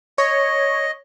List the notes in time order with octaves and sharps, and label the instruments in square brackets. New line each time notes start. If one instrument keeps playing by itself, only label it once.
[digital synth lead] C#5 [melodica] D#5